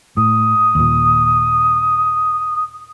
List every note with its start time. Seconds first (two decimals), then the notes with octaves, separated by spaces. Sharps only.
0.17 A2 D#6
0.75 D#2 A#2